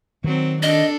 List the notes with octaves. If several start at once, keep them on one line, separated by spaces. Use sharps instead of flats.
D#3 F#3 C4
D4 A4 D#5